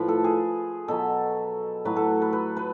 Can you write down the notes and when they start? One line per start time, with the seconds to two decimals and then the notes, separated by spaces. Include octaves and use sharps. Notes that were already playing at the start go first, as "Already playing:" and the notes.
Already playing: A2 F3 B4
0.08 A4
0.24 G#4
0.88 B2 F#3 A4
1.85 A2 F#3 B4
1.96 A4
2.22 B4
2.33 B4
2.56 B4